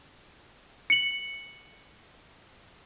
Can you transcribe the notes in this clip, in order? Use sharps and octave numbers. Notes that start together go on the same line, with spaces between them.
C#7 F#7